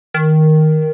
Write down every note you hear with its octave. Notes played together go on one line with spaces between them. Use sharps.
D#3